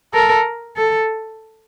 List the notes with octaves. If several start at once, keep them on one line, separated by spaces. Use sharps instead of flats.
A4 A#4
A4